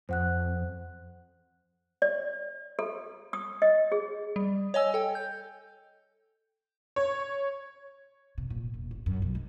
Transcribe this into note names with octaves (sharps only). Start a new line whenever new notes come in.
F2 C5 F#5 F#6
D5
A4
D#6
D#5
G#4
G3
C#5 D#5 G#5 E6
A4 G5
G6
C#5
C3
A#2
E1
A1
F#2
B1
G#3